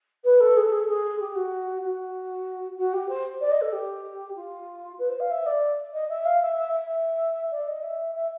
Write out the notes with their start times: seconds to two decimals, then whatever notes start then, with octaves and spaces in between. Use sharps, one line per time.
0.24 B4
0.40 A4
0.57 G#4
0.64 A4
0.72 G#4
0.80 A4
0.88 G#4
1.20 G4
1.35 F#4
1.83 F#4
2.77 F#4
2.93 G4
3.09 C5
3.41 D5
3.51 D#5
3.61 A4
3.73 G4
4.36 F4
4.99 B4
5.09 C5
5.20 F5
5.31 E5
5.46 D5
5.93 D#5
6.09 E5
6.25 F5
6.41 E5
6.56 E5
6.73 E5
7.51 D5
7.68 D#5
7.83 E5
8.15 E5